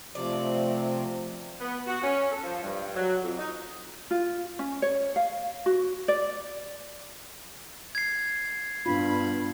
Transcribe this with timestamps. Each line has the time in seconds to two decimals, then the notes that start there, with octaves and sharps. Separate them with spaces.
0.15 C3 F3 A3 D5
1.60 B3
1.87 F#4
2.03 C#4
2.32 A4
2.44 F3
2.63 G2
2.95 F#3
3.23 F2
3.38 D#4
4.11 F4
4.59 C#4
4.82 C#5
5.16 F5
5.66 F#4
6.08 D5
7.95 G#6 C7
8.86 G2 B3 D4 F4 B5